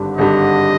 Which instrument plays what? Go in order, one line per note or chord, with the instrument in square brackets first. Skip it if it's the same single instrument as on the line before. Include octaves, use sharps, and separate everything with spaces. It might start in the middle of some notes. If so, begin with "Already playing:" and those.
Already playing: [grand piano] G#1 G2 D3 G3
[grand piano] G#1 G2 D3 G3 [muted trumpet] D#5